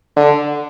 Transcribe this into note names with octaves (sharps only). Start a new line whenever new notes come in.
D3